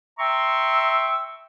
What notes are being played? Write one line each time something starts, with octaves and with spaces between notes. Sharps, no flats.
E5 G5 A#5 C6 C#6 E6